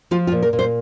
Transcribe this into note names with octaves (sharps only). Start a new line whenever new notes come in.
F3 F4
F4
A#2
A#4
A#2
C5